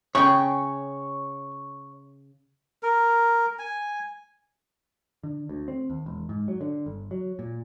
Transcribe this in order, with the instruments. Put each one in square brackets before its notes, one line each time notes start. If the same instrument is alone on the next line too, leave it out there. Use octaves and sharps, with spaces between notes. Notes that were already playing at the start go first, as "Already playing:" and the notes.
[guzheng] C#3 G#4 G5 [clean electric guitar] C#5 [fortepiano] C#6
[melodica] A#4
G#5
[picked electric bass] D3
D2
C4
D#2
E1
G#2
F#3
D3
G1
F#3
A#2